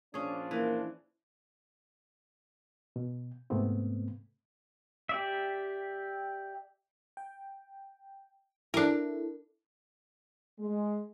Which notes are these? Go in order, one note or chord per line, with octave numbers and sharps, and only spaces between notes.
A#2 F3 C#4 D4 G#4
E3 A#3
B2
G#2 C3 A3 B3 C4
G4 D5 E5
G5
D4 E4 A4 A#4
G#3